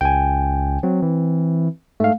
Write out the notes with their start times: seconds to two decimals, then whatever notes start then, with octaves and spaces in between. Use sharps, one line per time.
0.01 C#2 G5 G#5
0.83 F#3 C4
1.02 E3
2.00 G#2 A3 F5